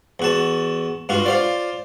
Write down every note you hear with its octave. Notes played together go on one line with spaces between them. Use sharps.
E2 F#4 A5
G2 F4 F#4
F4 C5 D5